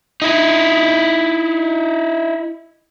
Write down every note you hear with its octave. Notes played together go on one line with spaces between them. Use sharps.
D#4 E4